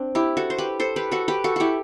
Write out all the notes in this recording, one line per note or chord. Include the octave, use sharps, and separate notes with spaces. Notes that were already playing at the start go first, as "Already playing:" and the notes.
Already playing: C4 D4
E4 G4
F#4 A4
C5
G4 B4
A4 C5
G4 B4
F#4 A4
G4 B4
F#4 A4
E4 F#4 G4